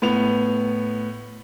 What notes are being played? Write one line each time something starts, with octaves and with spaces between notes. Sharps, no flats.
A2 B3 F7